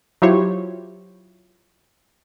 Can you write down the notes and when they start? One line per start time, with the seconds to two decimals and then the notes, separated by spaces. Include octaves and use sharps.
0.22 F#3 E4 F4 G4 C5 C#5